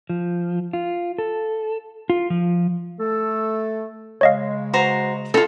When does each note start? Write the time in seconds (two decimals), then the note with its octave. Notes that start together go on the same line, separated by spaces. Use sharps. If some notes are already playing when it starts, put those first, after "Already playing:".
0.09 F3
0.73 F4
1.18 A4
2.10 F4
2.30 F3
2.99 A3 A4
4.21 C#3 G#3 C#5 D#5 F5
4.73 F#4 C5 A#5
5.34 D#4 F4 A4